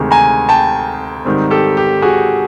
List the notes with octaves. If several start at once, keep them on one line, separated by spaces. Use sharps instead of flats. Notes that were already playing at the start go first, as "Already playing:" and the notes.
Already playing: D2 C3 D#3 G#3
G#5 A#5
G5 A5
G#2 D#3 G3 C4
G4 A4
G4
F#4 G#4